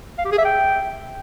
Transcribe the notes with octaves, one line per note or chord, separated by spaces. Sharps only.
F5
G4
G#4
E5
G5